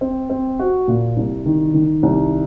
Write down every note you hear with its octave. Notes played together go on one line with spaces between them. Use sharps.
C4
C4
F#4
A#2
C2
D#3
D#3
C2